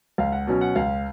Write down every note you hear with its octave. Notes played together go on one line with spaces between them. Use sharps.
C#2 F5
F#5
B2 F#3 C#4
F#5
C#2 F5